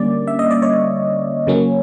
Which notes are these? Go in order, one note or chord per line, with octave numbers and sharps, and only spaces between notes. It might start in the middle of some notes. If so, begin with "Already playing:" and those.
Already playing: D3 G3 A#3 C#4 D5
E5
D#5
D5
C#5
C#3 F#3 A#3 C#4